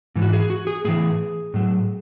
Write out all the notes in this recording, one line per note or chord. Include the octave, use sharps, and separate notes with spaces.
G#2 E3
F#4
G#4
F#4
G#4
A2 E3 G#4
A2 F#3